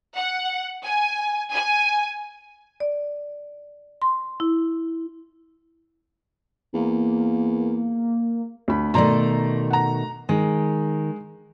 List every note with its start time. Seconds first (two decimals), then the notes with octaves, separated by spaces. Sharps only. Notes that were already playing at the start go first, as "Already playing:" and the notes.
0.16 F#5
0.84 G#5
1.52 G#5
2.80 D5
4.02 C6
4.40 E4
6.74 E2 A#3
8.68 D2 B5
8.94 B2 D#3 A3 D5 A#5 C6
9.70 F#5 A#5
10.29 D#3 G#3